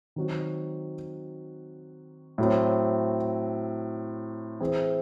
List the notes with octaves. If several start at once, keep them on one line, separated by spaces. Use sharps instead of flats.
D#3 F#3 C4 F#4
A2 F#3 C4
E3 C4 E4 G#4 C5